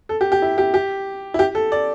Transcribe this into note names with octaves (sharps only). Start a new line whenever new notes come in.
A4
G4
G4
E4
G4
G4
E4
G4
A4
D5